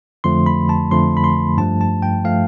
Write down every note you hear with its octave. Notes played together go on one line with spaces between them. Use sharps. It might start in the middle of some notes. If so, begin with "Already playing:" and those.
F2 D3 F3 A3 C6
B5
A5
F2 D3 F3 A3 C6
B5
C6
G2 F3 A3 A5
A5
G5
F3 A3 F5